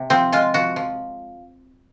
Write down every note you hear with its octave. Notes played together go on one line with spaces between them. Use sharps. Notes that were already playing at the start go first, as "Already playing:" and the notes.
Already playing: C3
F3 C4
G#3 F4
F3 F#4
F3